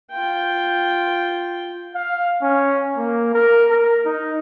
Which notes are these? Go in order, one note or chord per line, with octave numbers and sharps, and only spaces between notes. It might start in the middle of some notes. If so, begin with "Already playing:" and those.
F4 G5
F5
C#4
A#3
A#4
A#4
D#4